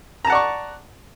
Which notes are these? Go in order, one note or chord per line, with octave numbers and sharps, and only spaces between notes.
D5 F#5 A5 A#5 C#6